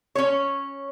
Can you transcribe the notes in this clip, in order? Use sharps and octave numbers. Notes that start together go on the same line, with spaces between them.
C#4 C#5